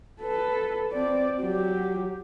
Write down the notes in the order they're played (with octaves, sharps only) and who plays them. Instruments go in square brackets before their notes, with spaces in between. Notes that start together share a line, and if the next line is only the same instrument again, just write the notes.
[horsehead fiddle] A4 B4
C4 D5
F#3 G4